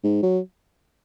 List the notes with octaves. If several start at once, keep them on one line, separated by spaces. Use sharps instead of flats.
G#2
F#3